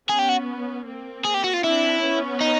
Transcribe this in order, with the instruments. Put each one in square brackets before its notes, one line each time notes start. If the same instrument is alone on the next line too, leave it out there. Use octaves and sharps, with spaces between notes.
[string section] B3 C#4 [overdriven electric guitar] G#4
[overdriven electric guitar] G4
F#4
[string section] A#3 C4
[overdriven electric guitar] G#4
G4
F#4
F4
[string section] C4 D4 [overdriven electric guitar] E4
[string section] B3 C#4
[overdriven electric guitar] D#4